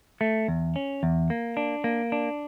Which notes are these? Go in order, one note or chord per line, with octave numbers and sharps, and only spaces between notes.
A3
E2
C#4
E2
A#3
D4
A#3
D4